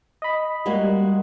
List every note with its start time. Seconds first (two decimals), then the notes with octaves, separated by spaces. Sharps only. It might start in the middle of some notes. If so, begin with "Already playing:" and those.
0.22 D#5 B5
0.66 G3 G#3 A#3 F#4